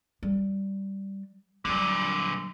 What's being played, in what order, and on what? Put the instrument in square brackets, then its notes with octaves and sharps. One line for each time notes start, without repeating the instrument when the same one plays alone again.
[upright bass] G3
[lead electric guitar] A#2 D3 [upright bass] F#3 G3